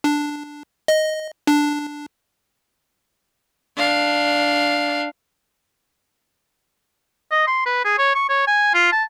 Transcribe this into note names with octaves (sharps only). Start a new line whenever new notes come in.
D4
D#5
D4
D4 F5
D#5
C6
B4
G#4
C#5
C#6
C#5
G#5
F4
A5